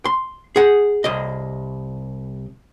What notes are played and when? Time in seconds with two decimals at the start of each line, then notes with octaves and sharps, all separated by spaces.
0.05 C6
0.56 G#4 F#5
1.04 C2 D#5